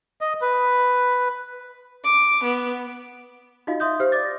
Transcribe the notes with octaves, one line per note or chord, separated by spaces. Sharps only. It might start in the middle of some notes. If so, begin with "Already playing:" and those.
D#5
B4
D6
B3
D#4 F4 F#4 D#5 F5
E5 C6 D#6 G6
G4 C5 F5 F6
D5 D6 A6
A#6